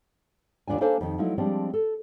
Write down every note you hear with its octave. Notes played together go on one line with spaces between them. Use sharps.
D#2 G#2 D4 F4 G#5
A#3 D4 A4 C5 F5 G#5
F2 D#3
F3 F#3 A3 D#4 E4
F3 G3 G#3 C4 D4
A4